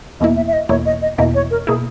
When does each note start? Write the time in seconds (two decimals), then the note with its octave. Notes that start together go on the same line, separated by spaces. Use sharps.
0.20 E2 B2 A#3 E4 D#5
0.36 E5
0.47 E5
0.53 D#5
0.69 E2 B2 A#3 E4 C#5
0.85 D#5
1.02 D#5
1.18 E2 B2 A#3 E4 D#5
1.34 C#5
1.51 A#4
1.67 B2 A#3 E4 G#4